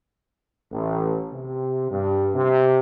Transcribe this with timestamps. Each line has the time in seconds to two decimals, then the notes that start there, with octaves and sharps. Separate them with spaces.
0.72 A1
1.33 C3
1.90 G2
2.35 C3